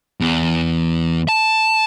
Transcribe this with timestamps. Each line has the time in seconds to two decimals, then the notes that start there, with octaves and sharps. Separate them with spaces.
0.20 E2
1.29 A5